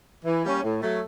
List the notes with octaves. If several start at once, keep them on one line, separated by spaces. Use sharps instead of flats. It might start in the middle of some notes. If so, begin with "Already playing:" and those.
E3
G3 A#3 C#4
A2
F#3 A3